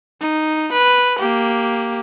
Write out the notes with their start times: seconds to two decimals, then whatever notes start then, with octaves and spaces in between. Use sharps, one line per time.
0.21 D#4
0.72 B4
1.19 A#3 G4